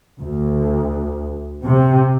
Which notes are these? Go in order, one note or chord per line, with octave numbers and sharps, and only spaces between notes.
D2
C3